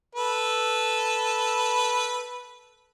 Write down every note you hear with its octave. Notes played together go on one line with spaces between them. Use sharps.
A4 B4